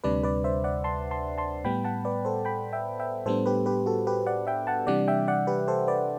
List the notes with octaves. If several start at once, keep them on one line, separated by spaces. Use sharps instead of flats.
D2 C3 G3 D4 B4 D5
B4 D5
C5 E5
D5 F#5
A5 C6
A5 C6
A5 C6
A2 G3 B3 G5 B5
F#5 A5
B4 D5
A4 C5
G5 B5
E5 G5
E5 G5
A2 G3 B3 D4 A4 C5
G4 B4
G4 B4
F#4 A4
G4 B4
D5 F#5
E5 G5
F#5 A5
C3 E3 G3 D4 D5 F#5
E5 G5
D5 F#5
G4 B4
A4 C5
B4 D5